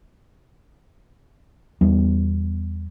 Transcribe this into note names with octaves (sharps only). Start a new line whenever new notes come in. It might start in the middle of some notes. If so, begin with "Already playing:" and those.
E2 G3 B3